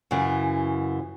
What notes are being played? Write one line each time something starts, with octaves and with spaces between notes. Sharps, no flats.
F#2 C#3 E3